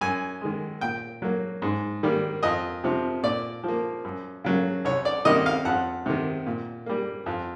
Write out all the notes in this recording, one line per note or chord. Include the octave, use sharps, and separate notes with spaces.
F#2 G#5
D#3 G#3
A#2 G5
F#3 A#3
G#2
D#3 G3 A#3
F2 D#5
C3 F3
A#2 D5
F3 A#3
F#2
C#3 F#3 A#3
C2 C#5
D5
C3 D#3 G3 A#3 D#5
F5
F2 F#5
C3 D#3
A#2
G3 A#3
F2